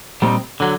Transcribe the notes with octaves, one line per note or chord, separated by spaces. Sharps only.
A#2 G3 C4 D#4
D3 F#3